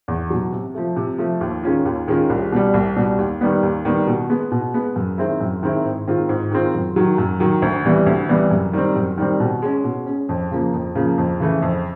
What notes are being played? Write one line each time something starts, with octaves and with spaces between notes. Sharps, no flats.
E2
B2 F#3
C3
F3 A3
C3
F3 A3
D#2
D#3 G#3 C#4 F4
D#2
D#3 G#3 C#4 F4
C2
B2 G3
C2
B2 G3
D#2
D#3 G3 B3
D#2
D#3 G3 B3
B2
G#3 B3
B2
G#3 B3
F#2
D#3 G#3 C4 E4
F#2
D#3 G#3 C4 E4
G#2
D#3 G#3 C4 F4
G#2
D#3 G#3 C4 F4
F#2
D#3 F#3
F#2
D#3 F#3
D2
C3 E3 G3 B3
D2
C3 E3 G3 B3
F#2
D#3 G3 C4
F#2
D#3 G3 C4
B2
G#3 C#4
B2
G#3 C#4
F2
C#3 F3 A#3
F2
C#3 F3 A#3
F2
C#3 E3 A3
F2